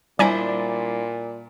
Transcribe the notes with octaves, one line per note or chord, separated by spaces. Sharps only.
A#2 G3 D4 E4 C5 D5 G#5 A#5